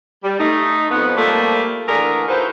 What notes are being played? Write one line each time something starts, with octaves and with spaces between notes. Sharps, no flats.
G3
A3 D#4
F2 B3
F3 G3 A3 A#3
D3 E3 A3 D4 G#4 A#4
F3 D#4 E4 F#4 B4 C5